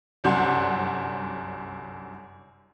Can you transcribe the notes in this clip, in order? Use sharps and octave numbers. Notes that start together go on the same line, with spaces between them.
G1 C2 F#2 D4 F#5 C6